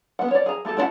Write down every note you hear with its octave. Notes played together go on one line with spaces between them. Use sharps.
B3 F#5
C#5 D5
G#4 A#5
A3 E4 G4 A4
A3 D4 E4 F#5